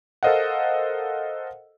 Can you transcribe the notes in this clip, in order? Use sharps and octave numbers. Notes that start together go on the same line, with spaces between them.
A4 A#4 C5 D#5 F5 F#5